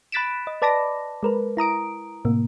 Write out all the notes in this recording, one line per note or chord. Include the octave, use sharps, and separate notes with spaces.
B5 F#6 A6 B6 D7 E7
D#5
B4 D5 A5 B5 D6 A#6
G#3 A#4 B4
E4 A#5 D#6 D7
A2 C3 A#3